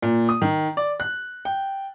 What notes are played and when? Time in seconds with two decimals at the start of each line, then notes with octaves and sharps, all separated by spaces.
0.02 A#2
0.29 D#6
0.42 D#3
0.77 D5
1.00 F#6
1.45 G5